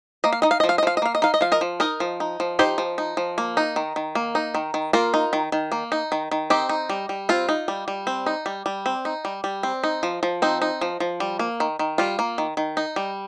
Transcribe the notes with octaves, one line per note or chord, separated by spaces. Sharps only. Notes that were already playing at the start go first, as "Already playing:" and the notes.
A#3 D#5
F5
D#4 D#5
F5
F3 D#5
F5
D#5
F3 F5
D#5
A#3 F5
D#5
D#4 F5
D#5
F3 F5
A#4 D#5
F3
D#4 A#4 D#5
F3
D#4
F3
D#4 G4 C5
F3
D#4
F3
A#3
D#4
D#3
D#3
A#3
D#4
D#3
D#3
A#3 F4 A#4
D#4
D#3
D#3
A#3
D#4
D#3
D#3
C4 D#4 G4
D#4
G3
G3
C4 F4
D#4
G3
G3
C4
D#4
G3
G3
C4
D#4
G3
G3
C4
D#4
F3
F3
C4 D#4
D#4
F3
F3
G3
A#3
D#3
D#3
G3 F4
A#3
D#3
D#3
D#4
G3